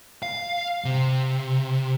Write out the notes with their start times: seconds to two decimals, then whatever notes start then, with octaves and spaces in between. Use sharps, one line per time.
0.23 F5
0.85 C3